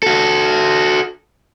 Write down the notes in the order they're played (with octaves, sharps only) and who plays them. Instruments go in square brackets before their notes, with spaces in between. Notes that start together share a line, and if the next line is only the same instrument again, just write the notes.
[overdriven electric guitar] F#4 A4